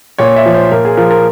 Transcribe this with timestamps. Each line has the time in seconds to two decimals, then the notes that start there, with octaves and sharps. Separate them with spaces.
0.18 A#2 C#5
0.36 E5
0.46 F3
0.54 C5
0.72 A#2 A#4
0.85 G#4
0.97 F3 A#4
1.11 A#4